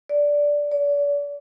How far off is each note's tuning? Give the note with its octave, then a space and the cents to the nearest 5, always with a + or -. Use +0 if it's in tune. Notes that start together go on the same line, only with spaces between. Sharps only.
D5 -10
D5 -40